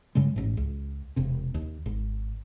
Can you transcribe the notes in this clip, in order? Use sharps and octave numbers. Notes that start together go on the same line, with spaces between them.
G2 C#3 G3 G#3
A1 G#2
C#2
E1 C3
D#2
G#1